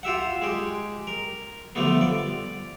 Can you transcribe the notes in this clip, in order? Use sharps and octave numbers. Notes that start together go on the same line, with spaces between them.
F4 G4 E5 F#5
G#3 G4
A#4
D3 F3 G3 A3 B3
D5